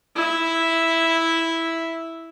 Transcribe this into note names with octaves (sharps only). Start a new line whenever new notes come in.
E4 E5